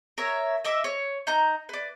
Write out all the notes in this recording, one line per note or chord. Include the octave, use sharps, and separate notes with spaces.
A#4 C#5 E5
D#5 E5 D6
C#5
D#4 A#5 G6
B4 D5